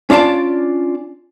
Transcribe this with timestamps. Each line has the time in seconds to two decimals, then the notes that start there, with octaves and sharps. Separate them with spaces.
0.10 C#4 D4 F4 D5 A5